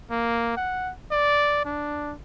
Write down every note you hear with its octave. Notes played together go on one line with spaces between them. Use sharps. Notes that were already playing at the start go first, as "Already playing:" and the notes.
A#3
F#5
D5
D4